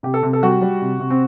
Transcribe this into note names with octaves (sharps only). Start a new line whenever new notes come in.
C3 G4
A4
C3
A4
G3 F#4
G3
C3
C3
C4